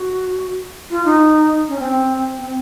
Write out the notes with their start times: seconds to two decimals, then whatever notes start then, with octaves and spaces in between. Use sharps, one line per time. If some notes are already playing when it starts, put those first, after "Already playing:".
Already playing: F#4
0.91 F4
1.05 D#4
1.68 C#4
1.79 C4
2.39 C4